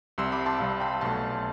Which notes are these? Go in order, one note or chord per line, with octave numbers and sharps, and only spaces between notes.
C2 C3 G3 C6 E6
B5 D6
A5 C6
C2 C3 G3 F5 A5
G5 B5
B1 B2 A3 A5 C6